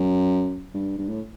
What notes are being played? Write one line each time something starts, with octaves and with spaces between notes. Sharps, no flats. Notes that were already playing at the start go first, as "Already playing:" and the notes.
Already playing: F#2
G2
G2
A2